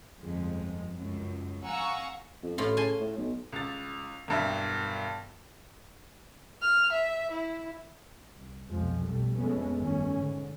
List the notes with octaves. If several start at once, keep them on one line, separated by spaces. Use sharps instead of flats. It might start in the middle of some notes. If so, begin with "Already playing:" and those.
G1 F2 G#3
C#2 F#2
F5 F#5 G#5 A#5 C#6 E6
F2
A1 A2 F4
C#3 G#5 A5 C6
A2
B1
C#2 A6
E1 G2 E5
F6
E5
E4
C2
B1 F2 C3 F3 G#3
B1 G3 A3
F2 G#3 A3 B3 C#4
G1 D#3 A3 C#4
G#2 D3